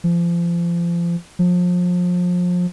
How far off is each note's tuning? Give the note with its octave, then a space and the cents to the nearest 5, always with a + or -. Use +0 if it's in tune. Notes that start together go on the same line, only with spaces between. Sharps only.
F3 -30
F3 +30